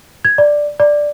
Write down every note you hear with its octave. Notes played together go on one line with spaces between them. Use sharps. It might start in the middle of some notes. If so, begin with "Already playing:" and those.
G#6
D5
D5